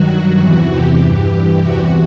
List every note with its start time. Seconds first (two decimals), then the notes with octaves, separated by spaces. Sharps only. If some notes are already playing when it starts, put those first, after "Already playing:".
Already playing: G2 D#3 F#3 F#4
0.40 E2 C3 E3
0.71 G4
1.01 G2 E3
1.61 E2 C3 E3 F#4